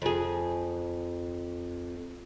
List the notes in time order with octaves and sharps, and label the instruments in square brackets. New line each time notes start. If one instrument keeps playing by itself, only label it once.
[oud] F2 G#4